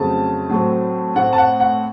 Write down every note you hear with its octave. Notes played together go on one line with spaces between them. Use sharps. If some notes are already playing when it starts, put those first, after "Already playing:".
Already playing: F2 C#3 F#3 A3 C4 A5
A2 F#3 A3 C4
A2 A3 C4 F#5
A5
F#5
F#5